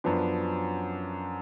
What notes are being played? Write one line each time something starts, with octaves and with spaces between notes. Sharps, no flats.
F#2 F3 B3 D4